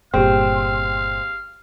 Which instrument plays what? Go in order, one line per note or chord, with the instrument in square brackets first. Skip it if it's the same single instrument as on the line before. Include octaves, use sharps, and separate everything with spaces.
[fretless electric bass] G1 A#2 [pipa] C4 [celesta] G4 G#4 [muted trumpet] F5